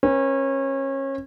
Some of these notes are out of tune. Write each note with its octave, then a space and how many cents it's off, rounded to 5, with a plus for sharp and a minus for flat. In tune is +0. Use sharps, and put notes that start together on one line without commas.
C#4 -30 B4 -35